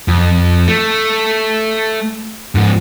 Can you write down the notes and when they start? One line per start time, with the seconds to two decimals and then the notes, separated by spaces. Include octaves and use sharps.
0.08 F2
0.68 A3
2.55 G#2 F3